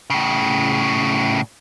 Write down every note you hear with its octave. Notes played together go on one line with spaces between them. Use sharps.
A2 C#3